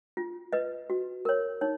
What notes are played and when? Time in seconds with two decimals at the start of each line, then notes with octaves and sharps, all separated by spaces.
0.17 F4
0.53 B4 D#5
0.90 F#4
1.25 A#4 C#5
1.61 D#4 C#5